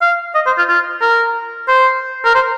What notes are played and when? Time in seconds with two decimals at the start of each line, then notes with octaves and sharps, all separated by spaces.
0.02 F5
0.35 D#5
0.46 C5
0.58 F4
0.69 F4
1.02 A#4
1.68 C5
2.25 A#4
2.35 C5